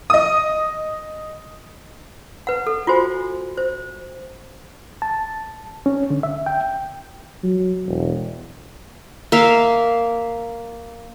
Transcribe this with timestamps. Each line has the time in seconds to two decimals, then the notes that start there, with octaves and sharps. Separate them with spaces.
0.10 D#5 D#6
2.47 B4 F#5
2.67 A4
2.87 F4 F#4 C5 G#5
3.57 C5
5.02 A5
5.86 C#4
6.10 D3
6.23 E5
6.46 G5
7.44 F#3
7.87 E1
9.32 A#3 E5 F5